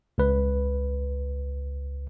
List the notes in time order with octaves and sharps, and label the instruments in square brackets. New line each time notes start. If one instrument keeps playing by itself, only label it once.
[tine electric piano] C#2 B4